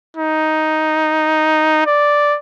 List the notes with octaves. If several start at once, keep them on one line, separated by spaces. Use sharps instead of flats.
D#4
D5